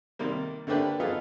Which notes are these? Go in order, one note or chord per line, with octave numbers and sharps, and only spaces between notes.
C3 D#3 G3 A#3
D3 A3 A#3 D4 G4 B4
B3 D#4 F4 G#4 A4